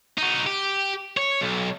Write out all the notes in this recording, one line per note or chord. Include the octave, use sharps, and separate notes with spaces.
D#4 F#4
G4
C#5
B1